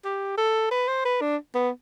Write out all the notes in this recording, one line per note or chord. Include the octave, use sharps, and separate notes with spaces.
G4
A4
B4
C5
B4
D4
B3